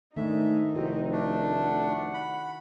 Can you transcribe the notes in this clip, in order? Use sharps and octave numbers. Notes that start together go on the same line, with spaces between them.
G#2 D#3 A3 D4 D#4 E5
F1 C4 E4 F#4
A3 D4
F#5
B5